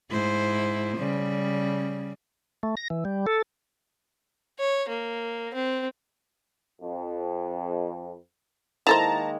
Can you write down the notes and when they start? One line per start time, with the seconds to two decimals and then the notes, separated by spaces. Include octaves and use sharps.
0.11 G#2 E4 C5
0.98 C#3 G3
2.63 A3
2.77 A#6
2.90 E3
3.05 G3
3.27 A4
4.59 C#5
4.89 A#3
5.54 C4
6.81 F2
8.87 D#3 G#3 A#3 E4 A4 C5 A5 A#5